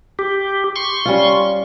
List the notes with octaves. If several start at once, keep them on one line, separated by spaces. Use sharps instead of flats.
G4
C6 C#6
G3 C#4 F4